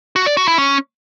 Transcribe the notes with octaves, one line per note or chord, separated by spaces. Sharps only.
F#4
D5
F#4
E4
C#4